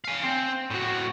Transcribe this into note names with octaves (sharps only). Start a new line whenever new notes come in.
F5 G#5
C4
A2 F#4